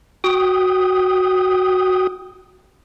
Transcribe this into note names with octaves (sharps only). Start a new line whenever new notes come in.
F#4 G5 D#6